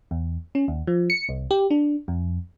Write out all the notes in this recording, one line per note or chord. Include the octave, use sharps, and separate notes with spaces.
E2
C#4
D#2
F3
C#7
C2
G4
D4
F2